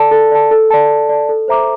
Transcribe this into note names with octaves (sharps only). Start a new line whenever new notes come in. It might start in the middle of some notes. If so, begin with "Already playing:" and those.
Already playing: A4 D5 A5
A4
D5 A5
A4
D5 A5
A4
D5 A5
A4
C5 E5 A#5 D6